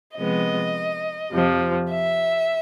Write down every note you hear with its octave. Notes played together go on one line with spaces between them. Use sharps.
C3 F3 G#3 B3 D#5
F2 C3 F3
E5